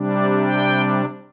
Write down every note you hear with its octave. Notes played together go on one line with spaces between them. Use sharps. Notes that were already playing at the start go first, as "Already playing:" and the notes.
Already playing: C3 G3 D4
D5
G5